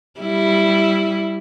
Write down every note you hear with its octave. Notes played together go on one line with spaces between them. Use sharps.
G3 E4